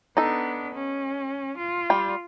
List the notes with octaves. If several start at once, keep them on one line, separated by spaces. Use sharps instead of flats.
B3 D4 D#4 A4
C#4
F4
G3 G5